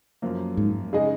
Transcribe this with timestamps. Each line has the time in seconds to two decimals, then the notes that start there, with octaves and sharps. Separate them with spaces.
0.22 F#2 F3 A#3
0.57 G#2
0.93 C#3 G#3 D#4 G#4 D#5